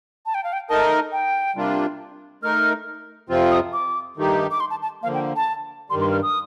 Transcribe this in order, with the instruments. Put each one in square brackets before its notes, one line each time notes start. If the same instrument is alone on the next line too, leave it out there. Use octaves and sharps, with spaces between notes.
[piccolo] A5
G5
F5
G5
[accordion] A3 D#4 A#4 D#5 [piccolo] A5
[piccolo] G5
[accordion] C3 G3 A#3 D4 F4
[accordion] A3 D#4 A#4 [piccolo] F6
[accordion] F2 C3 F3 C4 F4
[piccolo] D#6
D6
[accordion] G2 D#3 A3 D#4 G4
[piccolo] D6
C6
A5
A5
[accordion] D3 F3 A#3 [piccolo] F5
[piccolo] G5
A5
[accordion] G2 D#3 G3 [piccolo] C6
[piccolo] C6
F6
D#6